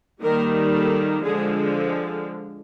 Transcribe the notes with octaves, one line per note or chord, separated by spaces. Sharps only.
D#3 G3 A#3 A#4
A4
D3 F3 G#3 G#4